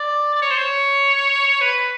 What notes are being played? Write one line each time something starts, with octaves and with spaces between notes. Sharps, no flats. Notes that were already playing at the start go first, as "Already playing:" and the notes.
Already playing: D5
D5
C#5
C5
C#5
B4